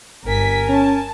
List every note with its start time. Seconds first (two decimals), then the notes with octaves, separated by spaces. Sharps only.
0.24 G1 A#4 G#5 B6
0.69 C#4 A5